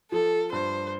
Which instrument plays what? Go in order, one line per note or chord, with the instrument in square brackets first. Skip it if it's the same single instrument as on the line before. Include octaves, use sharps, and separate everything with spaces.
[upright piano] F3 [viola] A4
[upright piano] G2 [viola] C5